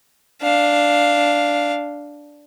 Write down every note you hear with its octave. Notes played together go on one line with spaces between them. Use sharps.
D4 F5